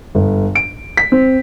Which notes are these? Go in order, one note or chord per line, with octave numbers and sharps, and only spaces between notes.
G1
D7
B6
C4